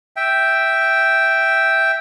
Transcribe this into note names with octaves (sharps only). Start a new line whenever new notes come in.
E5 G5